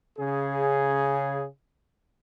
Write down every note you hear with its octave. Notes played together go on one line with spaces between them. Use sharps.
C#3 G#4